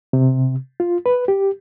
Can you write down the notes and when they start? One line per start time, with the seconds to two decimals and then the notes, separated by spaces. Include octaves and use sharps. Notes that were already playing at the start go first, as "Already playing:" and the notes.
0.13 C3
0.80 F4
1.06 B4
1.28 G4